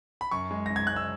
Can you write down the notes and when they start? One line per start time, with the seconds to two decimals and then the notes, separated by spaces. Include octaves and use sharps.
0.21 B5
0.31 F#2 C#6
0.51 G#3
0.66 F#2 A#6
0.76 G#6
0.87 G#3 F#6
0.96 E6